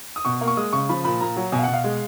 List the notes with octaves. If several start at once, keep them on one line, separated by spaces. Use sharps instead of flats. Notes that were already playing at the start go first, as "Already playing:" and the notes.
D#6
B2 C#6
A#3
C#6
G#3 D#6
C#3 C#6
F3 B5
A#2 B5
A#2 A#5
F#3
B2 G#5
F5
B2 F#5
F5
G#3